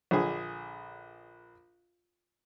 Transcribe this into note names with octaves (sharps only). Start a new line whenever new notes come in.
A#1 D3 G#4